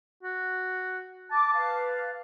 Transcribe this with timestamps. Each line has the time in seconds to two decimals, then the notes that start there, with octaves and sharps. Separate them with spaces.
0.23 F#4
1.31 A5 D6
1.53 B4 F5